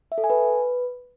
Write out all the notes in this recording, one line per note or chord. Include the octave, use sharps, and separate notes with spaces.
E5
A4
G#5
B4